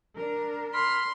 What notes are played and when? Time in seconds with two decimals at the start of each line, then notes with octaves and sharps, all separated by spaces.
0.16 D4 A#4
0.74 B5 C6 F6